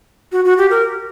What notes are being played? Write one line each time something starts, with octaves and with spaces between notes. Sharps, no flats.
F#4
F#4
G4
A#4